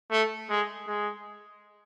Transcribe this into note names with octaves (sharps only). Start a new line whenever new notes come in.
A3
G#3
G#3